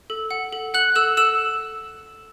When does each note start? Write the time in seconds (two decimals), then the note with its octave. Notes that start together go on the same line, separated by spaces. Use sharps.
0.10 A4
0.31 F#5
0.53 A4
0.74 F#5 F#6 F#7
0.96 A4 E6 E7
1.17 A4 E6 E7